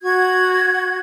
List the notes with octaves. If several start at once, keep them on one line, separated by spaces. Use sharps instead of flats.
F#4 G#6